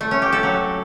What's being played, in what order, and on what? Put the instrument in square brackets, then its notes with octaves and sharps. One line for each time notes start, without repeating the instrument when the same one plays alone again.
[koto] A3
C#4
G4
A4
F#3